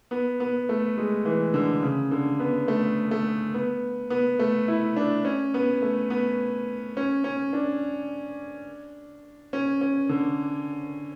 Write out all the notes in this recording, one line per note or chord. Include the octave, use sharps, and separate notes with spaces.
B3
B3
A3
G#3
E3
D3
C#3
D3
B3
A3
A3
B3
B3
A3
E4
D4
C#4
B3
A3
B3
C#4
C#4
D4
C#4
C#4
D3